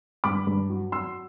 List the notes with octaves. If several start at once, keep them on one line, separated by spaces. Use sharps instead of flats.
G2 B5 D6
G2
F#3
F#3 C6 E6